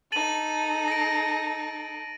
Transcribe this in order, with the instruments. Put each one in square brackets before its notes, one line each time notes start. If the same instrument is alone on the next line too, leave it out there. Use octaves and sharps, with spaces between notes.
[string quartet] D#4 A4 [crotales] A6 D#7 F#7
[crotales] A#6 D7